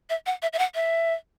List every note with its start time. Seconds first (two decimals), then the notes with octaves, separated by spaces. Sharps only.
0.10 E5
0.26 F#5
0.42 E5
0.53 E5
0.59 F#5
0.75 E5